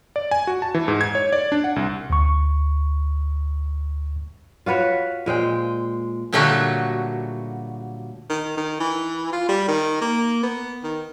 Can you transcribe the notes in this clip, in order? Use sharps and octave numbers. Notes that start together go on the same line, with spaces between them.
D5
G#5
F#4
A5
E3
G#2
G#6
C#5
D5
D4
F#5
C2
D2 C#6
F4 F#4 B4 C#5
A#2 G#3 C5 G5
A#2 D3 F#3 G3 A3 F#4
D#3
D#3
E3
F4
G3
D#3
A#3
B3
D#3